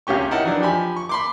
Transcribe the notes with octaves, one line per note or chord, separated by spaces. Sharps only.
C#2 C3 C#4 G4 C#6
D#4 E4 A#4 F#5 G5 A5
E3 F#3 D4 D#4
F3 G4 G#5 B5
C#6
B5 C6 D6